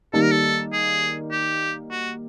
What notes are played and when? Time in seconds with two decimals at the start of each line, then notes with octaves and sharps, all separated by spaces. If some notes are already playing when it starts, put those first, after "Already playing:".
0.13 D#3 G3 A#3 A4
0.22 A#4
0.31 A4
0.73 G#4
1.31 G4
1.91 F#4